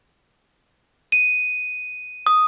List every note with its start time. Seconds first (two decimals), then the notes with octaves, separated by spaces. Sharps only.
1.12 D#7
2.27 D#6